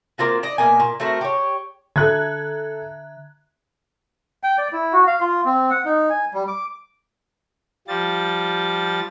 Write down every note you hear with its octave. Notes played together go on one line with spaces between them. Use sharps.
A#3 C4 F4 F#4
D5 D#5
B2 A#3 G#5
A#2
A3 C4 F#4 A#4
G4 C#5
D3 A4 E5 A#5 F#6 G#6
G5
D5
E4
F#4
F5
F4
C4
F#5
D#4
G#5
G3
D6
F3 G3 A6